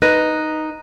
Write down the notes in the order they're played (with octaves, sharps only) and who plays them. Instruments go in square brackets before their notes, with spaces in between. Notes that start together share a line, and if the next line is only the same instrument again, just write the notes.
[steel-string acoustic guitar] D#4 [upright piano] B4 [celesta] F#6 A#6 D#7